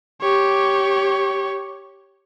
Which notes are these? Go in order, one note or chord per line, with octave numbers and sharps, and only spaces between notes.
G4 C#5